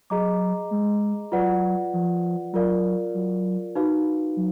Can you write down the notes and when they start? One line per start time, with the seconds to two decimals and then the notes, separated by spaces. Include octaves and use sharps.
0.10 F#3 G#4 D#5 A#5 D6
0.71 G#3
1.32 F#3 F4 B4 D5 F#5
1.93 F3
2.53 F#3 F4 A#4 D5 F5
3.14 F#3
3.75 D#4 F#4 B4 F5
4.37 F#3